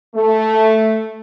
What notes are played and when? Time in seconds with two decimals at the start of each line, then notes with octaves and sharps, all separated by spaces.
0.15 A3